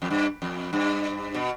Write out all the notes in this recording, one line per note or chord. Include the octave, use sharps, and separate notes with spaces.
F2
G2
F2
G2
B2